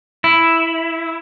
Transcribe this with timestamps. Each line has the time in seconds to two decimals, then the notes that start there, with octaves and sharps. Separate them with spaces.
0.24 E4